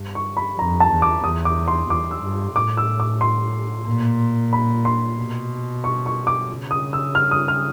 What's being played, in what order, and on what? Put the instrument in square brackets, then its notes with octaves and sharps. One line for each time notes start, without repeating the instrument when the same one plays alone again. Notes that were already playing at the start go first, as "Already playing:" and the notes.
Already playing: [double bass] G2
[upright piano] C#6
B5
[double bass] F2 [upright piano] A#5
[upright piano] A5
[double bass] E2
[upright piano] D6
[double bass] E2 [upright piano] D#6
[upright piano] D6
C6
[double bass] E2 [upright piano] D6
[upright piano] E6
[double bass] G2
[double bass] A2 [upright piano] D6
[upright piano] E6
D6
C6
[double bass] A#2
[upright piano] B5
C6
[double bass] B2
[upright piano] C#6
C#6
D6
[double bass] C#3
[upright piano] D#6
E6
F6
D#6
F6